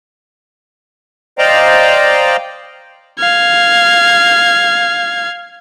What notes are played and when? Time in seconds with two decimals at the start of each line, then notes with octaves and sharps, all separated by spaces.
1.38 C5 D5 D#5 F5 G5 A#5
3.19 F5 G#6